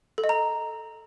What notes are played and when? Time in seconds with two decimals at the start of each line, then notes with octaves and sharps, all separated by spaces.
0.18 A4
0.24 D#5
0.29 A#5